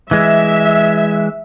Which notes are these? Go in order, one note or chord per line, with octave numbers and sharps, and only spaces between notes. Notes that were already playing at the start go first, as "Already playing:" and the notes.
E3 G#3 E5